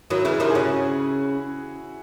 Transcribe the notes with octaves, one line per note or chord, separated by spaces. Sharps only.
D#3 F#3 E4
C#3 E3
E4
C3 D#3
G#4
C#3 F#4